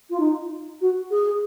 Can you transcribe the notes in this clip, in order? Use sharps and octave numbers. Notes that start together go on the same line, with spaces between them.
F4
D#4
F#4
G#4